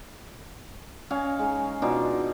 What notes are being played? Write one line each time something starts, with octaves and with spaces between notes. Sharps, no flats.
C#4 D#5 F5 G#5
G#3 D#4
B2 D4 D#4 F4